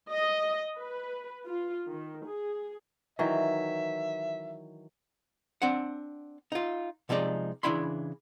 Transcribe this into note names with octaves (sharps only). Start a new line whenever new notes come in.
D#5
B4
F4
D#3
G#4
D#3 E3 F#3 E5
C4 D4 F#5
D#4 F4
C3 F3 G#3 D#4 D5
C#3 E3 D4 E4 B5 C6